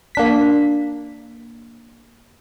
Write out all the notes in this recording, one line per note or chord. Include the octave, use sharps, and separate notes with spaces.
A#3 D4 B6